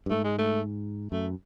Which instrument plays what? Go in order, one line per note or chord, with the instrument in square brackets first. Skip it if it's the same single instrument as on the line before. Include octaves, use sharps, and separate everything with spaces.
[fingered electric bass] G2
[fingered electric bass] G#2 [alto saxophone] A3
[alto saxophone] G#3
A3
[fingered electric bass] F#2 [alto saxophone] A3